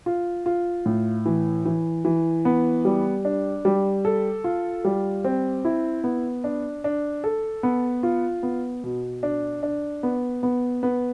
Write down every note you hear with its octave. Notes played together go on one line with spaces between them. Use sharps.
F4
F4
A2
E3
E3
E3
B3
G3
D4
G3
A4
F4
G3
C4
E4
B3
D4
D4
A4
B3
F4
B3
B2
D4
D4
B3
B3
B3